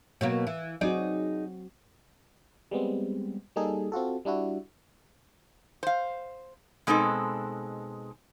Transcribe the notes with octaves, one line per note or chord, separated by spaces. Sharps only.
B2 F#3 A#3
E3
F#3 C4 D#4 F#4 G#4 D5
G3 G#3 B3 C4
G3 A#3 D#4 G#4 A4
C4 F4 F#4 A4
G3 D4 E4 F#4
C5 F5
B2 G#3 C4 D#4 A4